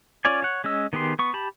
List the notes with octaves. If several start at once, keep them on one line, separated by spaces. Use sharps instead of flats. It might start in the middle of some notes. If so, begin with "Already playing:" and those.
C#4 F4 C#5 D5 G#5
C#5 F#5
G#3 C#4 D#5 E6
D#3 B3 G4 G#4 C6
B3 C#6
G4 A5 B5